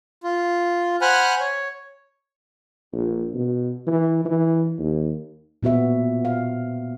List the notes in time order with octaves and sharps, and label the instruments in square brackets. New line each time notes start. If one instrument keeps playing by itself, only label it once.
[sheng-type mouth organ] F4
C5 F#5 G#5 B5 F6 F#6
C#5
[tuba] A#1
B2
E3
E3
D#2
[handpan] A#2 B3 F#4 E5
F5